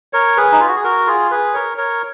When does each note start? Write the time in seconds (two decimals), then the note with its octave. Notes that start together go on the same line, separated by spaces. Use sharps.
0.13 A#4 C#5
0.37 G#4 B4
0.52 D#4
0.60 F4
0.68 F#4
0.76 G#4
0.84 F#4 A#4
1.07 F4 G#4
1.31 G#4 B4
1.54 A#4 C#5
1.77 A#4 C#5